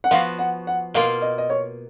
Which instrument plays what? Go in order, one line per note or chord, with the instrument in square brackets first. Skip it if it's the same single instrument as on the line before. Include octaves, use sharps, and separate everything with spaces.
[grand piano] F#5
[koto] F3 B3 F#4 [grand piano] F5
[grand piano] F#5
F#5
[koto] B2 A#3 F4 [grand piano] F5
[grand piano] D#5
D#5
C#5